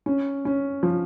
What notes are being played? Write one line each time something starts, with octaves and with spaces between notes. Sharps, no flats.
C#4
C#4
F3